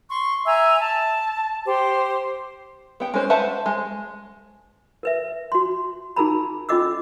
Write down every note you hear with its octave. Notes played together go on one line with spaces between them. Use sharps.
C6 C#6
E5 G#5 A#5 E6
A5
G4 C5
B3 G5
G#3 C#4 B4 C5
B4 C5 E5 F#5 A5
G#3
A#4 B4 E5
F#4 C6
D#4 F#4 G#4 A#4 A#5 B5
C#4 F4 A4 D#5 D6 E6